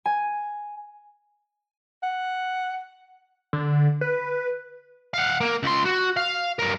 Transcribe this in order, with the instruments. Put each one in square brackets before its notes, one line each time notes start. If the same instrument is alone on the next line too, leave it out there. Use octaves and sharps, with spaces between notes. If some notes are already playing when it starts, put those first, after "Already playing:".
[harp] G#5
[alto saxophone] F#5
[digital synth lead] D3
B4
[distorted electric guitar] F5 F#5
A#3
C#2 C6
F#4
F5
G2 A#4